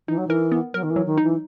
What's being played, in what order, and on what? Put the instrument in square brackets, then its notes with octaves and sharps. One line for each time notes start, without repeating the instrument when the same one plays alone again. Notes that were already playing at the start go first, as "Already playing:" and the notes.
[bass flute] E3 [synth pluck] D#4
[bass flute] F#3
[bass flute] E3 [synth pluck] A#4
[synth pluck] B3
[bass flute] F#3 [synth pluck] A#4
[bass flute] D#3
E3
[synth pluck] F#3
[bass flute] D#3
[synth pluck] D#4
[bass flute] E3